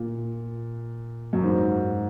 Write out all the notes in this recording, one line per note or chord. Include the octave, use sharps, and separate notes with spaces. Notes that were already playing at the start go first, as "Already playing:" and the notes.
Already playing: A#2
F#2
G#2